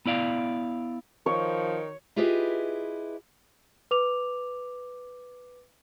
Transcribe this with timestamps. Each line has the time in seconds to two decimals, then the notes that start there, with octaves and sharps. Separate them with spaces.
0.06 B3 E4 D5 F5
1.26 D#3 F3 C#5
2.16 E4 F4 G4 G#4 B4 D#5
3.91 B4 D6 F7